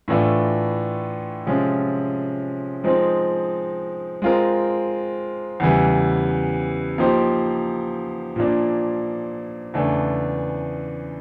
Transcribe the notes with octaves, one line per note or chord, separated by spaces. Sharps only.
A2 E3 A3 D4 F4
C3 F3 G#3 C#4 F4
F3 G#3 C4 D#4
G#3 C4 F4 A#4
E2 C#3 E3 G3
F3 A#3 D#4 G4 C5
A#2 F3 A#3 D4
E2 C#3 E3 A3 D4